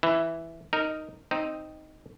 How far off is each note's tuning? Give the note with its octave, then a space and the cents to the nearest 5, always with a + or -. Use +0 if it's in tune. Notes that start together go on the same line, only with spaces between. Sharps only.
E3 +0 E4 +0
D#4 +0 A#4 -10
C4 +0 D#4 +0